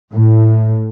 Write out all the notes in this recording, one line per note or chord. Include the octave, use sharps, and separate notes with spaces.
A2